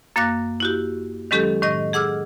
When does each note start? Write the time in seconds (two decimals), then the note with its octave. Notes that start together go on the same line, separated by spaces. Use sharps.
0.16 F#2 A#3 F5 D6 F#6 A#6
0.60 E4 F#4 G4
1.31 D#3 F#3 G#3 C#4 G4 A4
1.62 A2 D#3 D#5 A#6
1.93 G#4 F#5 D6 E6 F6